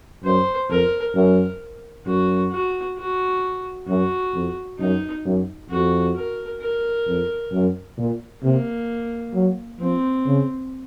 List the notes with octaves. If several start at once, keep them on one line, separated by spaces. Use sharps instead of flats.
F#2 C5
F2 A#4
F#2 A#4
F#2 F#4
F#4
F#4
F#2 F#4
F2
F#2 D#4
F#2
F2 F#4
A#4
A#4
F2
F#2
A#2
C3 A#3
F#3
F3 C4
C#3